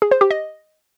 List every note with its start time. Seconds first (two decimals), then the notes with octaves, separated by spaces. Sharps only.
0.02 G#4
0.11 C5
0.21 G4
0.31 D#5